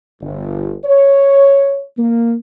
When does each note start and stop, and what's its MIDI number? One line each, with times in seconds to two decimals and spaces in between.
0.21 0.74 31
0.84 1.82 73
1.97 2.34 58